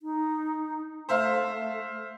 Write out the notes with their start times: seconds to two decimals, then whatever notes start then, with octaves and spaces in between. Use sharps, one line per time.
0.01 D#4
1.09 A3 C5 E5 F5